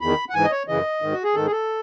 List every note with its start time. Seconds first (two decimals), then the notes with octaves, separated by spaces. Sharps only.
0.01 E2 D#3 B5
0.30 F#5
0.34 G#2 E3 G#5
0.44 D#5
0.51 C#5
0.68 F#2 C#3 E3 D#5
1.02 G#2 D#3
1.12 F#4
1.24 G#4
1.35 G#2 D#3 A4
1.46 G#4
1.52 A4